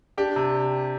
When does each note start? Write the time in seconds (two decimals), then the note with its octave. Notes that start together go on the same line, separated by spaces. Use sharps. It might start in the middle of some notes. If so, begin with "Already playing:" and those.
0.17 D4 G4
0.36 C3